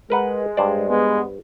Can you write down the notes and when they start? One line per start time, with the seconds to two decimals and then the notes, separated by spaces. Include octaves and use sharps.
0.10 G#3 A#4 B4 F#5
0.57 G2 C5 D5
0.89 G#3 B3